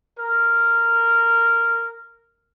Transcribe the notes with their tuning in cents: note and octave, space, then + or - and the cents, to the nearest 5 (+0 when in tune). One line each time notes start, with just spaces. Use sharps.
A#4 -10